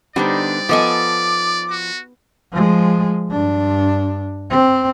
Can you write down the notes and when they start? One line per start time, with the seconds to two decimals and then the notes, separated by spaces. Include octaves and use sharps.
0.16 D3 G3 B3 D4 D#4 C5 D5
0.69 F3 B3 A4 D#5 G#5 D6
1.70 F#4
2.52 F3 G#3
3.28 G2 D4
4.50 C4